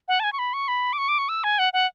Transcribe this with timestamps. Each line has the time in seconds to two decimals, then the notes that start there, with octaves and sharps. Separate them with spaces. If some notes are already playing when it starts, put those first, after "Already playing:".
0.08 F#5
0.20 A5
0.24 G#5
0.33 C#6
0.39 B5
0.53 C#6
0.68 B5
0.93 D6
0.98 C#6
1.08 D6
1.18 C#6
1.29 E6
1.44 G#5
1.59 F#5
1.73 F#5